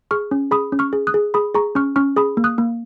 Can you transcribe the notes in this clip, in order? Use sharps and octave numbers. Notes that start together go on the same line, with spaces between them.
G#4 C#6 F6
C#4
G#4 B5 D#6
C#4
C#6 F6
G#4
D#6 F#6
G#4
G#4 B5 D#6
G#4 A#5 C#6
C#4 C#6 F6
C#4 C#6 F6
G#4 B5 D#6
A#3
D#6 F#6
A#3